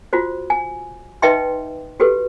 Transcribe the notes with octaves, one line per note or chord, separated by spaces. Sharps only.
F4 F#4 C5
G#5
D#4 B4 D#5 E5 G5 C6
F#4 G4 A4 B4